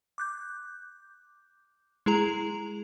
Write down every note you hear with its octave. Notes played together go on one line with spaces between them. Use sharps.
D6 F#6 G6
G#3 E4 G#4 A#5 F7